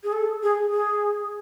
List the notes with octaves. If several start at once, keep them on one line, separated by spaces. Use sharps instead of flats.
G#4
A4
G#4
G#4